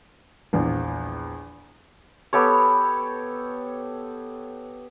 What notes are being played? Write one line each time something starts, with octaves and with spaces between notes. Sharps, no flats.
A#1 E2
B3 G4 A4 C#5